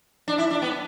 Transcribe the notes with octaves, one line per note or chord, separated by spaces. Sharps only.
D4
E4
D4
B3